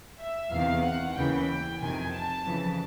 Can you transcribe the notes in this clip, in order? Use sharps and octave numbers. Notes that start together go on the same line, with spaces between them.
E5
E2 C3 D#3 F5
F#5
D#2 C#3 E3 G5
F2 C3 D#3 G#5
A5
F2 C#3 E3